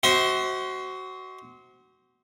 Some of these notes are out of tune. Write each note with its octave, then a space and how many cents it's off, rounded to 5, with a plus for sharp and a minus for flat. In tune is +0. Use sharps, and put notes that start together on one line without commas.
F#4 +20 C5 +0 E5 -45